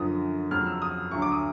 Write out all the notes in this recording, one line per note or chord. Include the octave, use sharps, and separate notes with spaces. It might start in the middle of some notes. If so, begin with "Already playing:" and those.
Already playing: F#2 D3 F3 D#6
F2 C#3 F#3 F6
E6
D#6
D2 D3 F#3 C#6
D6
D#6